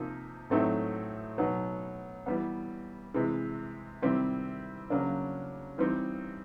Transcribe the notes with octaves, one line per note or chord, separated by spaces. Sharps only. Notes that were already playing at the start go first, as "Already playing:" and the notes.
Already playing: C3 F3 A#3 D#4
A2 F#3 A3 C4 D#4
B2 F#3 B3 D#4
E3 G3 B3
C3 E3 G#3
C3 D#3 G3 C4 E4
C#3 F#3 A#3 D4
E3 G3 C4 D#4